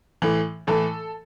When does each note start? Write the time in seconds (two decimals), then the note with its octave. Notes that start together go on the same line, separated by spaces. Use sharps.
0.22 A2 E3
0.67 A2 E3 A4